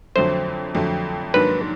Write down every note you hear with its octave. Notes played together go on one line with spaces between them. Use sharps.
F2 D3 F#3 A3 C5
F2 D3 F#3 A3
G#2 D#3 F#3 A#3 D4 B4